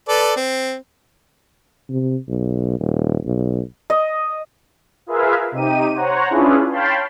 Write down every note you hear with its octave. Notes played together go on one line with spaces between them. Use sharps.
A4 B4 D5
C4
C3
B1
D#1
B1
D#5
F4 G#4 A#4 B4 E5 F5
C3 D#4 G4 D#7
C5 C#5 F#5 A#5
C#4 D4 E4 F4 G#4 B4
C#5 F5 G5 A5 B5 C6